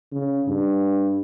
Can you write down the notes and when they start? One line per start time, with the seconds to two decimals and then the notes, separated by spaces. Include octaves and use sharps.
0.12 C#3
0.48 G2